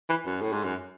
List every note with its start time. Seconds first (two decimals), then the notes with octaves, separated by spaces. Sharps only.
0.09 E3
0.26 F#2
0.42 A2
0.53 G#2
0.64 F#2